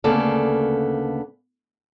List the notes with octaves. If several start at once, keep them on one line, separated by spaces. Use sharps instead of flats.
D2 C#3 A#3 B3 A4 D5